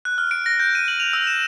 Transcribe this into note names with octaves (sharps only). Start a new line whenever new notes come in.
F#6
F6
D7
A#6
G6
D#7
F#7
F7
E6
E7